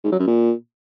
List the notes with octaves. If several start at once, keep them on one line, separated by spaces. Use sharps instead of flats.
G#2
F#3
F#2
A#2